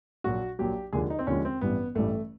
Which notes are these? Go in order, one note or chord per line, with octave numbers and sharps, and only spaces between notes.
A#1 A#2 F#3 F#4
A#1 A#2 F#3 G4
D#2 D3 F3 G#3 G#4
D#4
C4
D#2 D3 F3 G#3 C#4
C4
A1 G2 E3 G3 B3
A1 G2 E3 G3 A3